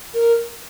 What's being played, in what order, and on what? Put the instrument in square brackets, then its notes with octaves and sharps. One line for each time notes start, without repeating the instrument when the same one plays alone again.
[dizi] A#4